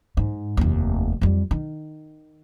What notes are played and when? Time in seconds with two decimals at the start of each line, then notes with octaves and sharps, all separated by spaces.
0.17 G#2
0.57 F1 D#2
1.21 F2 G3
1.51 D#3